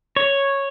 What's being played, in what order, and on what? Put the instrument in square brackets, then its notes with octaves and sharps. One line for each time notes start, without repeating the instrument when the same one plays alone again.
[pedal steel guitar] C#5